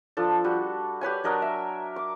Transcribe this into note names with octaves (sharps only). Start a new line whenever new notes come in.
F3 D4 A4
G3 F#4
G4 B4 C#5 G#5
F#3 D4 A#4 D#5
E5
D6